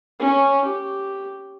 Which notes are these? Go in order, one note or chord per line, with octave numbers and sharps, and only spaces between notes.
C#4
G4